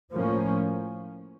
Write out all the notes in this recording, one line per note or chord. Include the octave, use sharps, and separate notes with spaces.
A2 F3 A#3 C#4